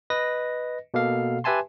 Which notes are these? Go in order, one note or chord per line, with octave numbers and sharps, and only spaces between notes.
B4 D#5 A#6
B2 A#3 A4 F5
G4 B4 E5 G#5 A5 C6